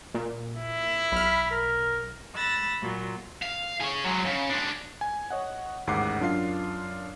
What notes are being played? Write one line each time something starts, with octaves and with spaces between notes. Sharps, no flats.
A#2
E4
B1 B5 F6
A#4
B5 E6 F#6 A6 A#6
A#2 F#3
F5
G#4 C#5
F#3 G#3
C#3
G#3 D4
G#5
C#5 D#5 F#5
A1 D#2 G#2 F#5 D6 C7
F#2 D4 F4 F5 C7